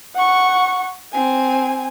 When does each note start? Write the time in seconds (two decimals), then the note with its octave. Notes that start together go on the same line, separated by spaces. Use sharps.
0.15 F#5 C#6
1.13 C4 G#5